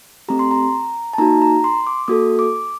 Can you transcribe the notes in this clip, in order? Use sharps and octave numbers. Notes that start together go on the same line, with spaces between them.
A3 C4 G4 A#5
C6
A#5
A5
A#3 D#4 F#4 A#5
A#5
C6
D6
A#3 F#4 A4 D#6
D6